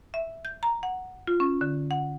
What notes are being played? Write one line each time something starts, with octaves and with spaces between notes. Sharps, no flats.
E5
G6
A#5
F#5
F4
C#4
D3
F#5